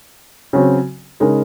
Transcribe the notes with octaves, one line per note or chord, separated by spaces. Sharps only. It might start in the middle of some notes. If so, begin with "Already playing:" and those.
C#3 F#3 C4
C#3 G#3 D#4 A#4